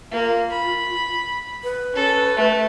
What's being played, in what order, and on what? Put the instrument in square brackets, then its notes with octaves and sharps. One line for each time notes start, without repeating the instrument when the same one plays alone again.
[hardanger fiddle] A#3 [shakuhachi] F4
[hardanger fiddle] B5
[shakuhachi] B4
[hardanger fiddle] C#4 A4
A3